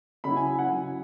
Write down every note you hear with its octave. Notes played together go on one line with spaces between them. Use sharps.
C#3 F#3 E4 B5
G#5
G#5
F#5
C#3 F#3 E4 G#5